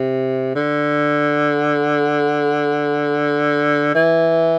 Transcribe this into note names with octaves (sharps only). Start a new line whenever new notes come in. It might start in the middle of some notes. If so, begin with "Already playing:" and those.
Already playing: C3
D3
E3